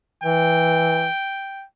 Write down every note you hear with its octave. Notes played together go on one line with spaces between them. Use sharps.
E3 G5